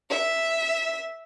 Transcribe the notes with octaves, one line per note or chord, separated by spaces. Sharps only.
E5